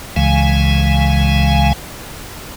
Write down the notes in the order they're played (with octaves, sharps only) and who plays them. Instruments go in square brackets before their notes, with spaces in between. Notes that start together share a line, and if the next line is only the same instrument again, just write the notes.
[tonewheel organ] C#2 C#3 E3 G#3 F5 G#5